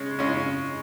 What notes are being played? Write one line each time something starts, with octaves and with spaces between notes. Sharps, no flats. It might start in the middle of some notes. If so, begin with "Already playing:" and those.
Already playing: C#3 G#3 C#4
C#3 G#3 C#4